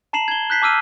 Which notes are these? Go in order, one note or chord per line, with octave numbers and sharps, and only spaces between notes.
A5 A#5 C7 E7 F#7
G#6 G7
F#6 G6 B6 C7
A5 D6 E6 F6 D#7